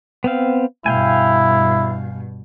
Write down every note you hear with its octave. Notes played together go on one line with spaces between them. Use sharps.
B3 C4 F5
G2 B2 E4 F5 G5 G#5